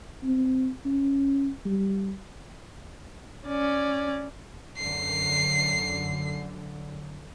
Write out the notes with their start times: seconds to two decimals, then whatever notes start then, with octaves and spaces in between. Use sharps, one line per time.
0.23 C4
0.85 C#4
1.65 G3
3.47 C#4 D5
4.77 F#2 D3 C7